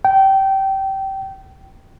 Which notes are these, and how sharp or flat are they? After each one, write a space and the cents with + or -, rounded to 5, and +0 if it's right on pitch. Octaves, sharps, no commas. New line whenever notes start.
G5 -20